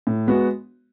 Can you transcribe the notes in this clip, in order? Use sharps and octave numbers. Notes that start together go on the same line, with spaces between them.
A2
G#3 B3 F#4